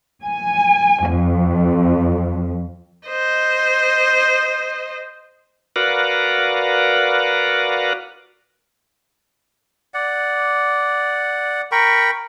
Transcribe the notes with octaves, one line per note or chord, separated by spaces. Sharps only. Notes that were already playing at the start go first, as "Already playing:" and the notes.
G#5
F2
C5 D#5
F#4 A#4 B4 D5 F5 F#5
D5 F#5
A#4 G5 B5 C#6